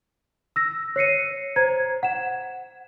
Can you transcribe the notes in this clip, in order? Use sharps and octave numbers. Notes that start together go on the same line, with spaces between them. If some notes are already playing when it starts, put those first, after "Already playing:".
E6 A#6
C#5 C7 C#7 D#7
C5 A#5 G#6
F#5 E7